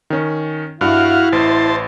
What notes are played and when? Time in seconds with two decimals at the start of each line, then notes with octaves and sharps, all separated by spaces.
0.10 D#3 C#4
0.81 G2 E4 F#4 F5
1.32 A1 C5 A5